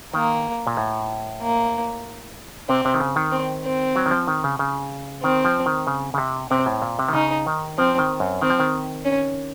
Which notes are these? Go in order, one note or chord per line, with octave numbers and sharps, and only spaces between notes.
D#3 A#3
A#2
A2
A#3
C3 C4
C3
D#3
C#3
D#3
C4
C4
F#3
D#3
F3
D#3
C#3
C#3
D#3 C4
F3
D#3
C#3
C#3
C3
C3 C4
A2
A#2
C3
D#3
C#3 D#4
D#3
F3 C4
D#3
F#2
D#3 C4
F3
D#3
C#4